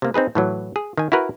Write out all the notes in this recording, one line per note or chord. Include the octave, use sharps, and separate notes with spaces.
C3 A#3
C4 D#4 G#4 B4
A2 E3 F#3
G#4
D#3 G#5
E4 F#4 A#4 B4